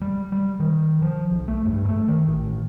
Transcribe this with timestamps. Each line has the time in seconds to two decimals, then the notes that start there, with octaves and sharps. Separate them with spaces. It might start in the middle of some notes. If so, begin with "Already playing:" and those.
0.01 G3
0.32 G3
0.59 D#3
1.02 F3
1.31 B1
1.48 A3
1.66 G2
1.89 A3
2.08 D#3
2.28 A1